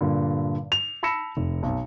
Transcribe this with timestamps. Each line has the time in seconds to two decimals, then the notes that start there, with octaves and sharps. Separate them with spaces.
0.01 G2 A#2 D3
0.72 F7
1.03 A5 B5 E6 A#6 C#7 E7
1.37 F1
1.63 B1